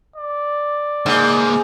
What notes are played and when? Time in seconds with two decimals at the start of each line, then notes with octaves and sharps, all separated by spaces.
0.16 D5
1.06 C#2 G#2 A#3